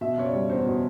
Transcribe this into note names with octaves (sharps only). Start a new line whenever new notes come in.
B2 E5
F#1 C#5
D5
G3
E2 C5
B2